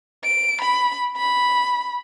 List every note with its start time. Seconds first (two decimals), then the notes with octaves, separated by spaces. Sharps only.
0.24 D7
0.61 B5
1.17 B5